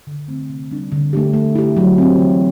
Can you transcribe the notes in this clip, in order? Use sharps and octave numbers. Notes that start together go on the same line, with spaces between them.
D3
A3 C4
C3
G3 D4
D3
A3 D4 G4
A3
E4 G4
F#3
C4 G4
E3